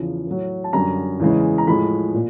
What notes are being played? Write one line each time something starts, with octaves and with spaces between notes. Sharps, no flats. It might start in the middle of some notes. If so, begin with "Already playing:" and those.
Already playing: E2 C#3 F3
A2 F#3
A5
F#2 D3 G3 A#5
E2 C#3 E3 G#3
A#5
A2 F3 G#3 B5
A#2